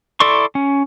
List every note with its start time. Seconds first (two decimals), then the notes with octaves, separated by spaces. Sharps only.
0.20 E4 A4 D5 C6 C#6
0.55 C#4